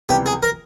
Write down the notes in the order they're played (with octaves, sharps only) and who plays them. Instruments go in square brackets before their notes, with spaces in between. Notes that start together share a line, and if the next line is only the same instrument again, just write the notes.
[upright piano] C#2 C3 E3 G3 B3 [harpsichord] G4
[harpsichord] G#4
A#4